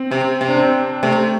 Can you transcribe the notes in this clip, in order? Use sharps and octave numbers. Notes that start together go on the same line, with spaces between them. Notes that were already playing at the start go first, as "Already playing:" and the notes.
Already playing: C4
C3 C4
C3 C4
D4
C4
C3 A3